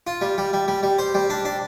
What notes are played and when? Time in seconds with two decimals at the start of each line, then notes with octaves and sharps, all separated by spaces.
0.07 F4
0.21 G3
0.38 G3
0.53 G3
0.68 G3
0.83 G3
0.99 C5
1.15 G3
1.30 D4
1.45 D4